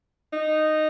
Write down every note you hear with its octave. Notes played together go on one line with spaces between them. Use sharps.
D#4